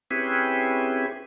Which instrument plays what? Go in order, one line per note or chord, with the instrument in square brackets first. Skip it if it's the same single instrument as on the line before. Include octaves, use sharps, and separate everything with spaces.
[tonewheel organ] C4 C#4 E4 G4 G#4 B4